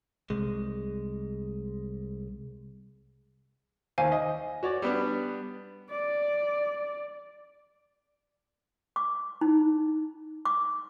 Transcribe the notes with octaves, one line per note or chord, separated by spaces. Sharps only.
C2 G#3
D#2 C5 F5 G#5
D#5
F#4 C#5 D5
G3 B3 D4
D5
D6
D#4
D6